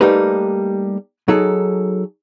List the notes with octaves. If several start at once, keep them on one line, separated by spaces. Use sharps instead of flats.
G3 A3 A#3 D#4 G4 B4
F#3 D#4 G#4 A4